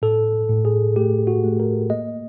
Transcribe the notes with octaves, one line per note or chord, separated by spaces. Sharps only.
A2 A4
A2
G#4
A3 G4
F#4
A3
A#4
A#3 D#5